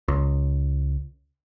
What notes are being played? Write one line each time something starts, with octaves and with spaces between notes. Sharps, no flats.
C#2